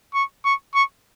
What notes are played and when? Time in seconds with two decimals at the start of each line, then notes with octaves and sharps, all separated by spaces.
0.14 C#6
0.45 C#6
0.74 C#6